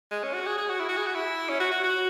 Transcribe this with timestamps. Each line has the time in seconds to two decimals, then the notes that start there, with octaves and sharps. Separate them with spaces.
0.11 G#3
0.23 C#4
0.34 F#4
0.46 G#4
0.58 G#4
0.69 F#4
0.80 E4
0.89 F#4
0.97 G#4
1.06 F#4
1.15 E4
1.49 C#4
1.60 F#4
1.71 F#4
1.83 F#4